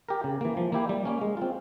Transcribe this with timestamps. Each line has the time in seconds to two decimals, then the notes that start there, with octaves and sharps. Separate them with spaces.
0.09 G4 A#4
0.24 C#3
0.41 E3 A#3
0.57 F3
0.72 A#3 E4 G4
0.89 G3
1.05 A#3 C#4
1.21 G#3
1.37 C4 F4